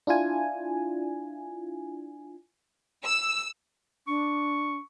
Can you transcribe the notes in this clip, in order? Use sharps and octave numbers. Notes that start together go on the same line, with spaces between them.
D4 E4 F4 G#5
E6
D4 C#6